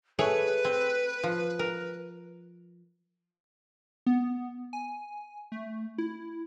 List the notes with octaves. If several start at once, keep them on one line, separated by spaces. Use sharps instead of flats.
A3 G#4 B4 C#5
C4
F3
A#4
B3
G#5
A3
E4